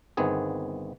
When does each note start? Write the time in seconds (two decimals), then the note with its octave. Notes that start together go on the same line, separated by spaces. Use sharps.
0.17 G1 D#3 B3 C4 G#4